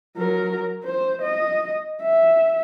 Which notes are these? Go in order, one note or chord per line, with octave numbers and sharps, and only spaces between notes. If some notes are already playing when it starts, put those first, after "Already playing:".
F#3 A#4
C5
D#5
E5